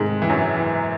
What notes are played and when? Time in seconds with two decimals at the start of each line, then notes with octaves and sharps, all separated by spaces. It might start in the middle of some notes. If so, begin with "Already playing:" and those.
Already playing: G#2 C3 D#3 G#3 A3
0.22 E3
0.30 F#2 F#3
0.56 E3